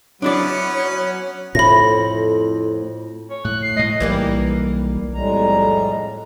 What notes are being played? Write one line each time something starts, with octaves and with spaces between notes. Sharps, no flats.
F#3 B3 C#4 D4 E4 C#5 D5 F#5
F2 A2 B5 A#6
C#5
A2 F#6
C7
A2 G#3 D#5
B1 E3 G3 A#3
F2 A2 G3 G#3 A#5